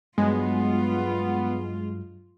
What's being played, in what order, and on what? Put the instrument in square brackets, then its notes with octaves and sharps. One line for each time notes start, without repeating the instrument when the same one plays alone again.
[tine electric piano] G2 F#3 [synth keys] G#3 [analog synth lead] B3 [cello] F4